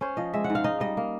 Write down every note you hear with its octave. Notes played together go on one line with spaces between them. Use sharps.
C#4 C5
F3 D#5
G#3 E5
F#5
G#2
F5
D#4 D#5
G3 D#5
A#3